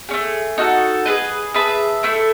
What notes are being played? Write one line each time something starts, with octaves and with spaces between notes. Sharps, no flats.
A3 C#4 G#4
D#4 F#4 A4
G#4 B4 D#5
G#4 B4 E5 A5
A3 E4 A4